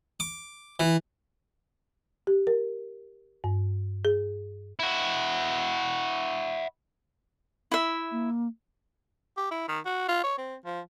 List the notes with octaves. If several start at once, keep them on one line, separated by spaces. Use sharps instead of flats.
D6
E3
G4
A#4
G2
G#4
E4 F#4
E4 E5
A#3
G4
E4
D#3
F#4
F4
C#5
C4
F3